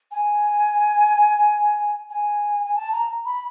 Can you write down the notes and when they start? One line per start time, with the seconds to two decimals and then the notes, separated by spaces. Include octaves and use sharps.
0.11 G#5
2.10 G#5
2.64 G#5
2.76 A5
2.92 A#5
3.25 B5